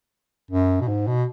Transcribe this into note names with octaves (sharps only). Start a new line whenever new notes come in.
F#2
B2
G#2
B2